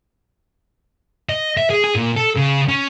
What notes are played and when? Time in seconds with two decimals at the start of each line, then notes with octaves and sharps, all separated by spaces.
1.29 D#5
1.57 E5
1.70 G#4
1.84 G#4
1.96 A#2
2.16 A4
2.36 C#3
2.68 C#4